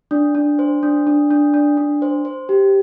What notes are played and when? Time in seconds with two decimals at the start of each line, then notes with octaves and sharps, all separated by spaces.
0.11 D4
0.35 D4
0.59 C5
0.83 D4
1.07 D4
1.31 D4
1.54 D4
1.77 D4
2.02 C5
2.25 C5
2.49 G4